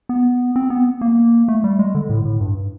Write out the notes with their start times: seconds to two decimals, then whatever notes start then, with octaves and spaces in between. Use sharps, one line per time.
0.09 B3
0.56 C4
0.70 B3
1.01 A#3
1.48 A3
1.64 G3
1.79 G#3
1.95 D3
2.10 A2
2.25 A2
2.41 G2